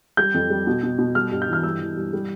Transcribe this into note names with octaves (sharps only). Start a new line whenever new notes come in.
G3 G6
F2
G3
B2
B2
B2
G3 F6
G2
G6
E3 F6
G2 E6
E3
G2
G3